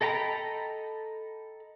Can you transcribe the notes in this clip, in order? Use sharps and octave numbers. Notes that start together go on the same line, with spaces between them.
A4 D#5 G5 A#5 B5